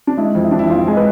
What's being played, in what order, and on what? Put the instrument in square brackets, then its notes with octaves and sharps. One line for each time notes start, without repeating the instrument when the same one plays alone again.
[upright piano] D4
G#3 E4
F2
E4
F2 D4
E4
F2 F4
G#3 G#4
B4